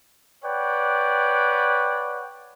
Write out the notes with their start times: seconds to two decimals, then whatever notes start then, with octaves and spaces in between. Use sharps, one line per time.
0.45 B4 C#5 D5 F#5 G5